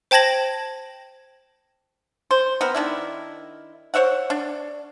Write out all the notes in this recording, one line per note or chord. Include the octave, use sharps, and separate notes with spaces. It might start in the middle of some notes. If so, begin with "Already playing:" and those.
C5 G5 A5 G#6 A#6 F#7
C5
B3 C4 A#4
D#3 D4 E4
C5 C#5 E5 F#5
D4